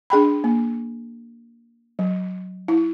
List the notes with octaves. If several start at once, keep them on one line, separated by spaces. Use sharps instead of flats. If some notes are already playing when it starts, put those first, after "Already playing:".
D4 G#4 G5 B5
A#3
F#3
E4